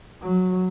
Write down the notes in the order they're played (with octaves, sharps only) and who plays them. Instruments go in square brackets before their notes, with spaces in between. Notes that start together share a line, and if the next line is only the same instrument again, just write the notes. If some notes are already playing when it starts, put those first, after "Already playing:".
[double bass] F#3